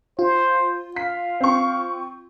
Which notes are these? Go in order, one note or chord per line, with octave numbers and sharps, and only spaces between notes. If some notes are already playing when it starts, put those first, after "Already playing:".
F4 C5
F5 B6
C4 C#6